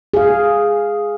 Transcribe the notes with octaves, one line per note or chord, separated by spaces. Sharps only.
G#4 F5